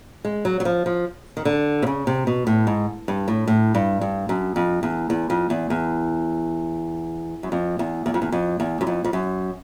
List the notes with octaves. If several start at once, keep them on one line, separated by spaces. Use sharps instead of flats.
G#3
F#3
F#3
F3
F3
D#3
D3
C3
C#3
C3
B2
A2
G#2
G2
A2
A2
G2
G2
F#2
F2
E2
E2
F2
E2
E2
F#2
F2
E2
E2
F2
E2
F2
E2
F#2
F2
F2
F#2